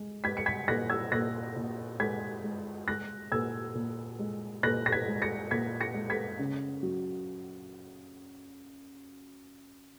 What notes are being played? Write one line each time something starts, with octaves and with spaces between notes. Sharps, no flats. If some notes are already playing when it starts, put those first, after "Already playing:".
Already playing: G#3
G#3 G#6 B6
C#7
G#6 B6
A#2 F#6 A#6
E6 G#6
A#2 F#6 A#6
A#2
G#3 G#6 B6
G#3
G#3 F#6 A#6
A#2 E6 G#6
A#2
G#3
A#2 F#6 A#6
A#6
G#6 B6
G#3
A#6 C#7
A#2 G#6 B6
A#6 C#7
G#3
G#6 B6
C#3
F#3